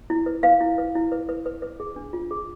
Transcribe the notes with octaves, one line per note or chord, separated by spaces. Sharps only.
E4
B4
B4 F5
E4
B4
E4
B4
B4
B4
B4
G#4
D4
F4
G#4